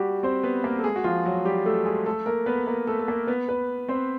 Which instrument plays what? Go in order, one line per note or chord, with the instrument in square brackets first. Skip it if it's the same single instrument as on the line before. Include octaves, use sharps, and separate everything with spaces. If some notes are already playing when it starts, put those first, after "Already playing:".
Already playing: [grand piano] G3 F#4 G4
C4 C5
B3 B4
A#3 A#4
A4
G#3 G#4
F#4
F3 F4
F#3 F#4
G3 G4
A3 A4
G#3 G#4
A3 A4
A#3 A#4
B3 B4
A#3 A#4
A3 A4
A4
A#3 A#4
B3 B4
B3 B4
C4 C5